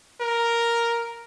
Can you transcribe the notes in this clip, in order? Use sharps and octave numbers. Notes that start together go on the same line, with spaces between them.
A#4